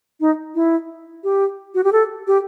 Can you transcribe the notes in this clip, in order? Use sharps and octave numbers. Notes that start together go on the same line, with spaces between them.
D#4
E4
G4
F#4
G4
A4
G4